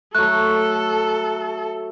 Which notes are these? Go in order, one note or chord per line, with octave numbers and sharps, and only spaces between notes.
F#3 A3 A4 F#6